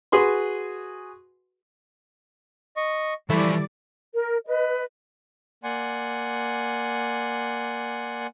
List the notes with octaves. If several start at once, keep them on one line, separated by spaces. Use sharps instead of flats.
F#4 G#4 B4 C6
D#5 C#6
E3 F3 G3 E4 A4 D5 B5 C#6
A#4
B4 D#5
A#3 D5 F#5 G#5 C6